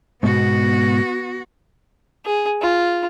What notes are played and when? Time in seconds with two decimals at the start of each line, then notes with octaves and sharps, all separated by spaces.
0.23 G#2 B2 B3 F#4
2.25 G#4
2.62 F4